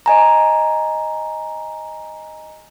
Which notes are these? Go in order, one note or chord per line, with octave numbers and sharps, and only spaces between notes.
D#5 G#5 A#5